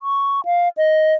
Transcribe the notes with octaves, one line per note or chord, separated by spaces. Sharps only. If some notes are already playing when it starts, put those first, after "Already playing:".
C#6
F5
D#5